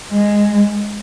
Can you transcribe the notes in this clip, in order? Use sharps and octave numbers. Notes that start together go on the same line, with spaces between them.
G#3